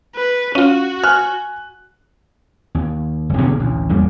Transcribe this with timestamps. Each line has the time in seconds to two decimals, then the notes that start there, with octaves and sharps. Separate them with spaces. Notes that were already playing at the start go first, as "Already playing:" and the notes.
0.16 B4
0.55 C#4 F4 F#4 F5 D#7
1.03 G#5 F6 F#6
2.75 D#2
3.29 G1 C2
3.42 B2 D3 D#3 A#3
3.60 A1 D2
3.89 G#1 E2 G3 A#3